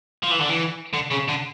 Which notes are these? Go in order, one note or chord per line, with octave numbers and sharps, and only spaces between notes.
F3
E3
D3
E3
D3
C#3
D3